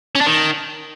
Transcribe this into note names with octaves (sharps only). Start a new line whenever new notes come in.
C#4
D4
D#3